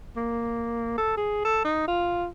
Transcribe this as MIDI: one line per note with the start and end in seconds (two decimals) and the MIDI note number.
0.17 0.96 58
0.98 1.16 69
1.17 1.45 68
1.45 1.62 69
1.65 1.87 63
1.88 2.27 65